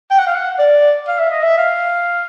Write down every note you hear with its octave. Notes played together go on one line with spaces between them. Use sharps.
G5
F#5
F5
F#5
D5
F5
E5
D#5
E5
F5